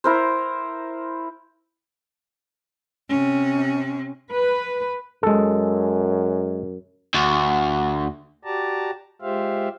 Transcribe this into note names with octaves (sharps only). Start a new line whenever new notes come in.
E4 A#4 C5
C3 C#4
B4
F#2 G#3 A4
D2
F#4 G4 D5 A5 A#5
G#3 F4 G4 C5 E5 F5